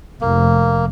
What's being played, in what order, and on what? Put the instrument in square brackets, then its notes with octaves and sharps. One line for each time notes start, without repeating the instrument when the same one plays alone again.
[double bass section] F1 [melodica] A#3